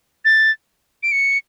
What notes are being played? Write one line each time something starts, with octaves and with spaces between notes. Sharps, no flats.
A6
D7
C#7